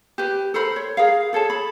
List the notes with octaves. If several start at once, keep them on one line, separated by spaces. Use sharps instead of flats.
G4 B4
A4 A#4 C5 B5
C#5
G#4 A#4 F5
G#4 A4 C#5 A5
B5